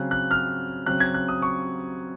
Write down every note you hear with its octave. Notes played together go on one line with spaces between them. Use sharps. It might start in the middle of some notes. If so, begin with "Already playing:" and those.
Already playing: C#3 F#3 C4 F#6
F#6
F6
C#3 F#3 C4 F#6
G#6
F#6
D#6
C#6